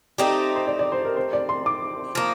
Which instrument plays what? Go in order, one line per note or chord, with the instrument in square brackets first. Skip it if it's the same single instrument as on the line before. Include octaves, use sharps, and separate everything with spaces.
[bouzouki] A3 C4 D#4 G4 [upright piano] D5
[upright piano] C5
D5
D5
C5
A#4
C5
D5
C6
D6
[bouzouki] F3 A#3